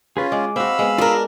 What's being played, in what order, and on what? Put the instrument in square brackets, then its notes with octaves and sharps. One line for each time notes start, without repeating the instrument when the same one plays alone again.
[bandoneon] C#4 F4 [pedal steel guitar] G#4 B4
[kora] G#3 [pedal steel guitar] D6
[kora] C4 F#4 [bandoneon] F5 B5 E6
[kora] G#3 B3
[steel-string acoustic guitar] D4 A#4 [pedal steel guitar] F4 G#4 D#5